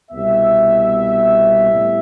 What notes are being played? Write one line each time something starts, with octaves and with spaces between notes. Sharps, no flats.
C2 B2 B3 E5
A2 G3 B3